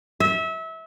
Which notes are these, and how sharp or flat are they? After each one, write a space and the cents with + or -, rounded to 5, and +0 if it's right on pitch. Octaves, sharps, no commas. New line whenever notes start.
E5 -25